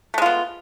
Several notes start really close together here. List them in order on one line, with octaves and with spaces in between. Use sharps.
A3 G#3 F4 B3